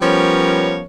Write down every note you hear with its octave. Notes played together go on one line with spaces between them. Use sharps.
F3 G3 B3 C#4 A#4 C#5